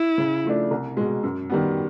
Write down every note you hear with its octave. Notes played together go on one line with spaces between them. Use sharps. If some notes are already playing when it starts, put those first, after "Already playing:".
Already playing: E4
C#3
F3 A3 D4
C2
B2 G#3
F#2
D#3 G3 B3